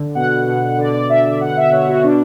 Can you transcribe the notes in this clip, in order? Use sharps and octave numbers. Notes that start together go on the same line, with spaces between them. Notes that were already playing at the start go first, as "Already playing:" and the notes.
Already playing: D3
B2 F#5
B2
D3 D5
D5
D3 E5
E5
B2 F#5
E5
B2 C#5
F#4
B2 D4